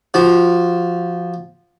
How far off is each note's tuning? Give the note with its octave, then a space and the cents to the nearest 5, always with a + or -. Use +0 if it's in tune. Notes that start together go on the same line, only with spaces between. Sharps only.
F3 +0 F#4 +20